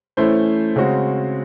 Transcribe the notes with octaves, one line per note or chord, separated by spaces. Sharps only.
E3 A3 C#4 E4 C5
C#3 G#3 C4 F#4